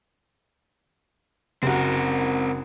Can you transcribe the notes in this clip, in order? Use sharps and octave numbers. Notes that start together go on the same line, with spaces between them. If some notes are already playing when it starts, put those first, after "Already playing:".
F#1 C4 F#4 A#4